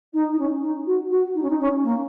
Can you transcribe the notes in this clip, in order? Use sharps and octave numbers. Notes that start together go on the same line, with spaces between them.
D#4
D#4
C#4
D#4
F#4
F#4
D#4
C#4
D#4
C#4
A#3